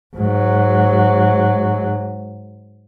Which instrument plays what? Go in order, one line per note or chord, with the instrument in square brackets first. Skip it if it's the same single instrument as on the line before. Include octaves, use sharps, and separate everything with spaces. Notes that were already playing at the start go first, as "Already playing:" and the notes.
[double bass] G#2 F#3